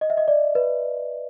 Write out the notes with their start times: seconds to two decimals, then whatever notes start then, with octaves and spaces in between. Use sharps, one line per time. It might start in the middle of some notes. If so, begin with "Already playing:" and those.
0.01 D#5
0.10 E5
0.17 D#5
0.28 D5
0.55 B4